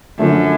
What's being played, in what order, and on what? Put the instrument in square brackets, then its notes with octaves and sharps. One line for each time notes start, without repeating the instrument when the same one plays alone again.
[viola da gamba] F#2 [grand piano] D3 F3 A3 D4